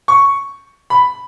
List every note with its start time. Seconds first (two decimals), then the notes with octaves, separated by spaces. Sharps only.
0.08 C#6
0.90 B5